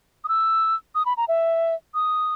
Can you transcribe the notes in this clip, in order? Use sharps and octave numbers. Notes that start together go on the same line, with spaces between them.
D#6
E6
D#6
B5
A#5
E5
D#6